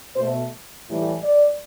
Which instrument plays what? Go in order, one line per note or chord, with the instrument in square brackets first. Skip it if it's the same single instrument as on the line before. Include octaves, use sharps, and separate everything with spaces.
[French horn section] B2 A3 C5
A2 E3 G3
D5